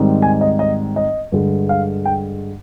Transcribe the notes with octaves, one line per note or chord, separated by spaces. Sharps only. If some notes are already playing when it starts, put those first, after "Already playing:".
Already playing: G#2 D#3 G3 C4
G#5
D#5
D#5
D#5
G2 D3 G#3
F5
G5